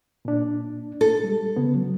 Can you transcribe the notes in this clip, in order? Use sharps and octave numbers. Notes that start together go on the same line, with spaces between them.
A#2 D4
A4
G3 G#3
C#3 B3
F#3